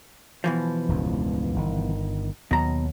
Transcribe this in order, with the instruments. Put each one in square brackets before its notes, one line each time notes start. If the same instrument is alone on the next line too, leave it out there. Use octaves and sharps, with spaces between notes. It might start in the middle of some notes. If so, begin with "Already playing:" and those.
[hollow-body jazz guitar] B2 E3 F3
[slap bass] E1 C#2 G2
G1 D#3
[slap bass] D#2 F#3 [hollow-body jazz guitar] B2 A#5